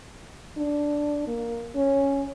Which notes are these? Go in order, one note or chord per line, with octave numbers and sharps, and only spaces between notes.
D4
A#3
C#4